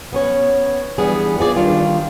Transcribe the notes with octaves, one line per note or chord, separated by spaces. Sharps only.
B3 C#4 C#5
E3 G3 B3 D4 G#4
B3 F4 G#4 D5
D#3 G3 D4 F4